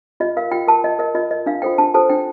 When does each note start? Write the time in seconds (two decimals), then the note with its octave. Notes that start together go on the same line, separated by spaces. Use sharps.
0.20 F4 D#5
0.37 A#4 F5
0.52 F4 G5
0.68 A#4 A5
0.84 F4 D#5
0.99 A#4 D#5
1.15 F4 D#5
1.30 A#4 D#5
1.46 D4 F5
1.62 F4 A4 C5 G5
1.78 D4 A5
1.94 F4 A4 C5 A5
2.09 D4 G5